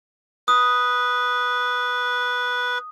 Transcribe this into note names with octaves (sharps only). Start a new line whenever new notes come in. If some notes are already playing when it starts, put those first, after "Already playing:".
B4 D#6